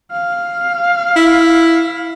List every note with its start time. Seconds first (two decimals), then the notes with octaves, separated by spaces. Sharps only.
0.12 F5
1.16 E4